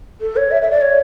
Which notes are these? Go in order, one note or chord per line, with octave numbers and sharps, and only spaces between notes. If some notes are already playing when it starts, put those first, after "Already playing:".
A4
C#5
E5
E5
D5
C#5